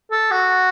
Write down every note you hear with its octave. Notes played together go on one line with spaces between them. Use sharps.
A4
F#4